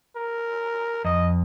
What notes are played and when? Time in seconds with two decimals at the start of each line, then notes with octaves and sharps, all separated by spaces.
0.16 A#4
1.05 F2 D#5